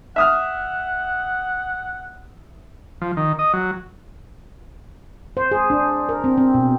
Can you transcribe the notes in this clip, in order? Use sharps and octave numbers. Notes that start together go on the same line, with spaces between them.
E5 F#5 D#6 F6
F3
D#3
D#5
F#3
C5
G#4
D4
A#4
C4
C4
B2